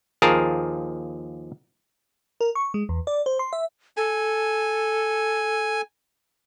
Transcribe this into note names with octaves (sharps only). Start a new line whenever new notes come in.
D#2 F3 G#4 A#4 A5
A#4
C#6
G#3
E2
D5
C5
C6
E5
A4 G#5